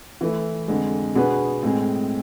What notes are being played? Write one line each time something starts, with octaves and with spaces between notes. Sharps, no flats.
E3 A3 E4
F2 D3 G#3
B2 B3 D4 G#4 B4
A2 G#3 C4 G#4